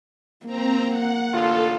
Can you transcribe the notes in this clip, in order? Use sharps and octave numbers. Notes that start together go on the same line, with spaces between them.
A#3 C4 A#5
F#5
A1 D3 F4 A4